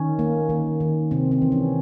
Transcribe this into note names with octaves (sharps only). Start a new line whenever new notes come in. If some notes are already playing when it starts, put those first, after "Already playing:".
Already playing: D#3 C#4
A#3
D#3
D#3
C3 C4
C4
E3
C#4